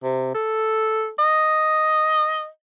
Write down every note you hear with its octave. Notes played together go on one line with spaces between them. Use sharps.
C3
A4
D#5